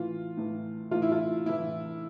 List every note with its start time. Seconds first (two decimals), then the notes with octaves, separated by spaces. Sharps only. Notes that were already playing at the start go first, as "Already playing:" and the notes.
Already playing: A2 E3 F4
0.37 A2 E3
0.91 A2 E3 F4
1.02 E4
1.12 F4
1.46 A2 E3 E4